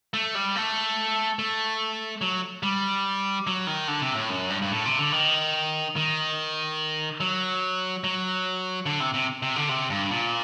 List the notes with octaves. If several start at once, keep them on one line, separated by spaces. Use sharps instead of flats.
A3
G3
A3
A3
F#3
G3
F#3
D#3
D3
C3
A2
F#2
G2
G2
A2
C3
D3
D#3
D#3
F#3
F#3
D3
C3
C3
C3
D3
C3
G2
A#2